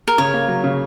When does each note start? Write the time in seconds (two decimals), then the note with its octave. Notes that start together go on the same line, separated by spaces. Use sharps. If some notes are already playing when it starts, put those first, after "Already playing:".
0.08 A#4
0.18 C#3 C#5
0.34 A#3
0.48 F#3
0.64 C#3